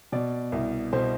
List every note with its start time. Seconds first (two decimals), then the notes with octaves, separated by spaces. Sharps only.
0.12 B2 D5
0.52 C2
0.93 B2 C5